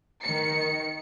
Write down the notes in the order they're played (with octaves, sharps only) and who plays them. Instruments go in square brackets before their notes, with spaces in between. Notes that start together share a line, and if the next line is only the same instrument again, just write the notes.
[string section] D#3 C#7